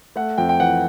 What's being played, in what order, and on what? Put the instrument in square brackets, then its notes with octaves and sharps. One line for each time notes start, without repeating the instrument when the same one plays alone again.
[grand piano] A3 F#5
F2 G5
G5
E3 F#5